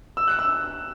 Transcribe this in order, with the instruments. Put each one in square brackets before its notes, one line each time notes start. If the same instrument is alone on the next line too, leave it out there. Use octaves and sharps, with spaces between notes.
[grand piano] E6
F#6
E6